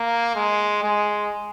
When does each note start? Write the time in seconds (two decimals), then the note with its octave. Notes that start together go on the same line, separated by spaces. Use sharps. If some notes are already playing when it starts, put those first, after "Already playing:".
Already playing: A#3
0.35 G#3
0.82 G#3